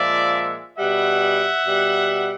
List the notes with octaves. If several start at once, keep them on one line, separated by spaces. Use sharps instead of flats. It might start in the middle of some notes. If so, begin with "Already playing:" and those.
Already playing: A#2 F3 G#3 D5 E5
B2 G3 E5 F#5
B2 G3